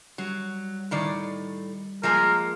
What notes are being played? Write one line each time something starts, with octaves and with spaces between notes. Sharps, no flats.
F#3 G3
A2 D#3 D5
F3 G#3 A#3 A#4